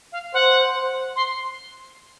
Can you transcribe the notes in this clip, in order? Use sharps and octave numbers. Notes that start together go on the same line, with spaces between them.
F5
C5 F#5
C5
C6